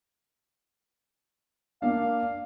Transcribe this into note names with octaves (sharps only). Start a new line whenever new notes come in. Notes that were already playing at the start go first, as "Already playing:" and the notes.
A#3 D4 F5